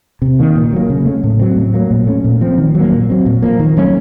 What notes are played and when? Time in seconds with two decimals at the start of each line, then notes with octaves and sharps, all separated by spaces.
0.22 C3
0.39 D#3 A#3
0.55 A#2
0.73 F#3 A#3
0.90 C#3
1.06 A3 C#4
1.24 A2
1.39 F#3 C4
1.56 A2
1.74 F#3 A#3
1.91 A#2
2.07 A3 C#4
2.24 A#2
2.41 F3 C4
2.58 D#3
2.75 F#3
2.80 A#3
2.92 A#2
3.10 F#3 C4
3.26 A#2
3.42 F3 A#3
3.59 D#3
3.77 F#3 A3 C#4